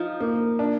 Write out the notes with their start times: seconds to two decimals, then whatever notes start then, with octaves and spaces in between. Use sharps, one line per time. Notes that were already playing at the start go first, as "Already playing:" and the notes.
Already playing: F3 D#4
0.21 A#3
0.59 D4